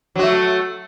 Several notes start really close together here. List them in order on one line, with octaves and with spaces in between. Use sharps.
F#3 F#4 A3